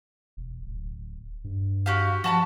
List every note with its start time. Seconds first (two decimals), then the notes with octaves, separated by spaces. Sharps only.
0.37 E1
0.66 D1
1.44 G2
1.86 F#4 G4 F5
2.24 F3 F#4 A5 B5